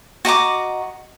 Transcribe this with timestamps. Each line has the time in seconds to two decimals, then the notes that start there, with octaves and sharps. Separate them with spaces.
0.25 F#4 D#5 A#5 D6